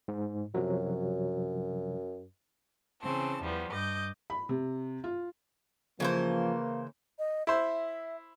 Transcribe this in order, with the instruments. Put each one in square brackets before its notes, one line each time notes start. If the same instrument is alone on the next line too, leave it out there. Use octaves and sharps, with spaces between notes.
[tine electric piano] G#2
[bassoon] F#2 [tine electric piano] C3 F3 F#3
[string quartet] C#3 E3 C4 A5
E2 F3 G3 B3
G2 D#5 D6 G6
[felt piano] B5
C3
F4
[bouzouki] C#3 E3 C5 [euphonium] F3 [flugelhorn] A#3
[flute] D#5
[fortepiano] E4 C5 [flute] E5